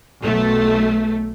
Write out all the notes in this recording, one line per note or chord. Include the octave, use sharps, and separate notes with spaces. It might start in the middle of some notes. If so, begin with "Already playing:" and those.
B1 A3